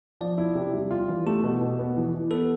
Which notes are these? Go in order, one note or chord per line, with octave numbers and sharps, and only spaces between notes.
F3 D5
E4
C3
G3
F4
E3
A3 G4
B2
B2
B3
E3
E3
B3 A4